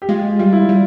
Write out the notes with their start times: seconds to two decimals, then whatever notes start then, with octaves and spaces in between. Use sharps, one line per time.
0.02 G4
0.09 G#3 F4
0.39 G3 F4
0.53 E4
0.69 G3